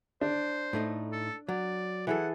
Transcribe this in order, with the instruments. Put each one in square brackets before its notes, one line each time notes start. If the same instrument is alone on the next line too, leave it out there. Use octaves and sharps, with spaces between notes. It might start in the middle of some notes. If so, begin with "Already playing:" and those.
[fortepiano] D4 [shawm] C5
[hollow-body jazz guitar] A2 A3 D#4
[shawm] A4
[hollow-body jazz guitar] F#3 [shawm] D5
[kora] E3 G#4 A4 [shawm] F#5